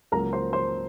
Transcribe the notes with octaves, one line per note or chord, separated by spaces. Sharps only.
C#2 C#3 F#3 A#3 A#4 A#5
C5 C6
C5 C6